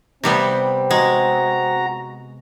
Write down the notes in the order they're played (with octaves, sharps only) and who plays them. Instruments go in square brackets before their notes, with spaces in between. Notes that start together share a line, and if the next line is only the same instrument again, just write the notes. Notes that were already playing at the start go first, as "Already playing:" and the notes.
[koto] C3 G3 B3 [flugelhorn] C4
[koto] G#3 [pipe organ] F#4 A#5